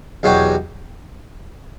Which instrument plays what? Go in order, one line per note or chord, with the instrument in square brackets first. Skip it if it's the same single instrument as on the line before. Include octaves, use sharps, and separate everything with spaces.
[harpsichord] E2 B2 F#3 C#4 G4